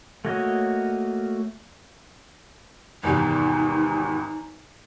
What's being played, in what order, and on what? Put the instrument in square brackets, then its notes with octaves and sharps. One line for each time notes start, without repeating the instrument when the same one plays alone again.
[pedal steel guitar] A3 A#3 F#4 C#5 D#5
[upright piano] G#1 E2 C3 [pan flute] D#4